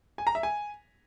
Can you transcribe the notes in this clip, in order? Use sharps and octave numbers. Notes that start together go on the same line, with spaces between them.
G#5
A#5
E5
G#5